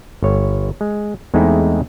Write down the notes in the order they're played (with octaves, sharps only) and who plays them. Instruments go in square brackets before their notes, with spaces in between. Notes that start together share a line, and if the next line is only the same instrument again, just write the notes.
[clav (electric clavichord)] G1 C#5
G#3
E2 G#3 A3 C4 D#4 E4